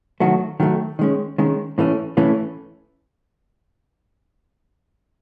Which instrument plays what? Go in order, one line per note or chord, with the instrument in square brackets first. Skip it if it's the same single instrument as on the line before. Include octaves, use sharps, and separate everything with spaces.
[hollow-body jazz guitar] D#3 F#3 A3
D#3 F#3 A3
D#3 G#3 C#4
D#3 G#3 C#4
A2 E3 A3 C#4
A2 E3 A3 C#4